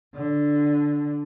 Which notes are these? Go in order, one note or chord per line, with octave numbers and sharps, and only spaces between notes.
D3